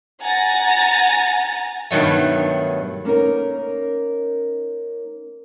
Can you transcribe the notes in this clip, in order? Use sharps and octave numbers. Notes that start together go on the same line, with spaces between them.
F#5 G#5 A#5 A6 A#6
G2 B2 D#3 F#3 A3
A#3 C#4 D#4 A#4